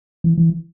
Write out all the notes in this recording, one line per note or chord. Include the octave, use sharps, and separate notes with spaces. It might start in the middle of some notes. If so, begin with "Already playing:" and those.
E3
E3